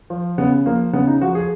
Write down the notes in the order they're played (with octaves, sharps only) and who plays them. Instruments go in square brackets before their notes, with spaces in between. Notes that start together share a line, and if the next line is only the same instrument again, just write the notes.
[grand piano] F3
C#3 B3
F3 A#3
C#3 B3
D#4
F3 F#4
G#4